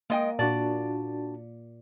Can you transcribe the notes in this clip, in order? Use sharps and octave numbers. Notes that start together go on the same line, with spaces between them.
G#3 A#3 D#5 G5
A#2 D4 F#4 D5 A5